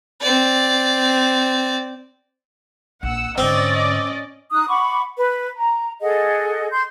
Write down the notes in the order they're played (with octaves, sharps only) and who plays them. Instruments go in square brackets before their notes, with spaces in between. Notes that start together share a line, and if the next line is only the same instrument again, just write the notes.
[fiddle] C4 D5
[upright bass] A#1 [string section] F#5 E6
[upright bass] G#2 D3 [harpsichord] C4 [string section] C#4 D5 D#5
[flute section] D#4 D#6 F#6
F#5 B5 C#6 D6
B4
A#5
G#4 A4 D#5 F#5
C6 G6